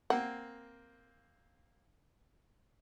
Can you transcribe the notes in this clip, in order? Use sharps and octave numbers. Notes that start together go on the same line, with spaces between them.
A#3 C4 F#5